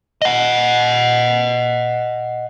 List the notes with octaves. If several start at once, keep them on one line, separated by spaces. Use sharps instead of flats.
D#5 F#5